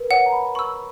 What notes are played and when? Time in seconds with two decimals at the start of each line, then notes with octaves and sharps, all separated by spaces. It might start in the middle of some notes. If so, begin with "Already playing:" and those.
Already playing: A#4 B4
0.11 C#5 F#5
0.26 A#5
0.33 B5
0.55 B5 C#6 E6